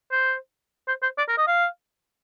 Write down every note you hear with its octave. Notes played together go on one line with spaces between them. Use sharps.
C5
C5
C5
D5
A#4
D#5
F5